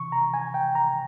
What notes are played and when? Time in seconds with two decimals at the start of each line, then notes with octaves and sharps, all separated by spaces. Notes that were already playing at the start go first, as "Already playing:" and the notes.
Already playing: C3 E3 C#6
0.12 A#5
0.34 G#5
0.54 G5
0.75 A#5